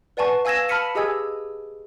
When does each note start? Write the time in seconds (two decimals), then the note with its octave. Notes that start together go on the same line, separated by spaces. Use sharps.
0.17 B4 D5 F#5 G#5 A5 C#6
0.45 F5 G#5 E6 G#6 A#6 E7
0.69 A5 B5 F6 B6 C#7 D#7
0.95 G4 G#4 D#5 G#5 E6 G#6